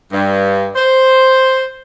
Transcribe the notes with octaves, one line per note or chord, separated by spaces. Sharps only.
G2
C5